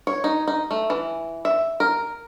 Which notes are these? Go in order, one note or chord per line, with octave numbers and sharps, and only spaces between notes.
C#5
D#4
D#4
A3
E3
E5
A#4